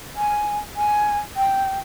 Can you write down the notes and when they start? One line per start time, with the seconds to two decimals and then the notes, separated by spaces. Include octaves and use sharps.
0.16 G#5
0.76 G#5
1.37 G5